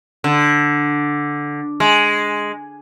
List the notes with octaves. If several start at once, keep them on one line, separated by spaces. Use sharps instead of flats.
D3
G#3